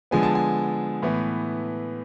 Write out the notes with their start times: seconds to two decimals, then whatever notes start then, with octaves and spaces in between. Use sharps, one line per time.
0.11 D3 F3 G#3 B3 G#5
0.23 A5
0.35 G#5
1.02 A2 E3 B3